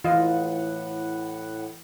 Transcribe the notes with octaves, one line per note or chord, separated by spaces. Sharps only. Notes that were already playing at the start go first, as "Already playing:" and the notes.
A2 E3 F4 D#5 F#5